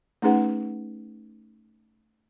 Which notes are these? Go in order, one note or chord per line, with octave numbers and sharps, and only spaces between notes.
A3 C#4 D#4 G#4 B4 F#5